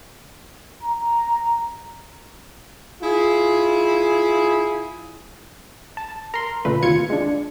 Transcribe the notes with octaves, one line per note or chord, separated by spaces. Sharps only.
A#5
E4 F4 G#4
A5
A#4 C6
C#2 A#2 D3 A3 B4
D#2 C3 F4 G#6 C#7
G#3 D4